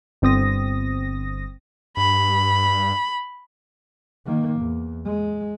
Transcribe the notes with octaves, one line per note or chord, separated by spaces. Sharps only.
G1 C4 D#6 A#6
G2 B5
D#3 A#3
E2
G#3